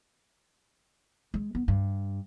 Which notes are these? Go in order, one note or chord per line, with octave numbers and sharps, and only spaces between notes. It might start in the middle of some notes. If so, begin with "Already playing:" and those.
G#3
B3
G2